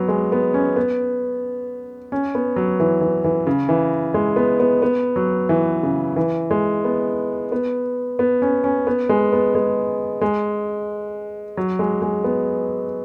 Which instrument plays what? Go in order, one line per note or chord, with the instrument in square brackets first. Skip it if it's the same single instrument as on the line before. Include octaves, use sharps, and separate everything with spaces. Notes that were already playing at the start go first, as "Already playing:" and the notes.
Already playing: [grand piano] F#3 B3
G#3
B3
C#4
B3
C#4
B3
F#3
E3
E3
E3
C#3
E3
G#3
B3
B3
B3
F#3
E3
C#3
E3
G#3
B3
B3
B3
C#4
C#4
B3
G#3
B3
G#3
G#3
F#3
G#3
G#3
B3